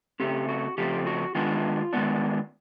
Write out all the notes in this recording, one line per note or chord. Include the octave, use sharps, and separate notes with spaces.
C#3 F3 A3 C4 G4
F#4
C#3 F3 A3 C4 G4
F#4
D#3 G#3 B3 D4 F4
D#3 G#3 B3 D4